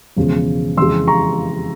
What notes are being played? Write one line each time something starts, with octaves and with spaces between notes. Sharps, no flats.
E1 E2 C#3 F3 G#3
F2 C#3 E3 G#3 C6 E6
A#5 C#6